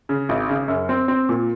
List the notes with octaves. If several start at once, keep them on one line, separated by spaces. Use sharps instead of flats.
C#3
G#1
C#3
F#2
C4
C4
A#2